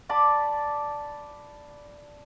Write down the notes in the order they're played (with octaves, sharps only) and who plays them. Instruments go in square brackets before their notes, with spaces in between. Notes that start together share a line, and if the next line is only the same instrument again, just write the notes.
[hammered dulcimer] D5 A5 B5 D6